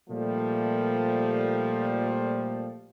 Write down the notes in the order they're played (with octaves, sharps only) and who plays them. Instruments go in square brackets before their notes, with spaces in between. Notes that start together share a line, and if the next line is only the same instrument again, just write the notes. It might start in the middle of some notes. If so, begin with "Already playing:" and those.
[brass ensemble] A#2 F3 G3 A3